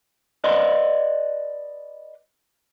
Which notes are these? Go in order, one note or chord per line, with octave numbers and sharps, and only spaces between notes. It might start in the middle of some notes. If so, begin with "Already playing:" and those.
B4 D5 D#5 C6